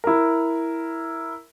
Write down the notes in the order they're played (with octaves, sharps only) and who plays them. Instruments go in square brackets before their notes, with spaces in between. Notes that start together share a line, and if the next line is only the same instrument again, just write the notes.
[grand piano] E4 A#4